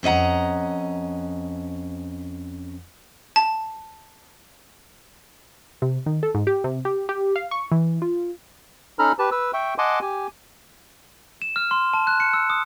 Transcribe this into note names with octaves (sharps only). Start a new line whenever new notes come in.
F2 C#4 D#5 F#5 A#5
A5
C3
D#3
A4
G#2
G4
C3
G4
G4
F5
C#6
E3
F4
C#4 D#4 A4 A#5 B5 F6
G4 B4 A5
B4 E6
E5 G5 C#6
D#5 F#5 G#5 A5 C6 D6
G4 G#5
E7
F6
C6
A5
F#6
C#7
E6
D#6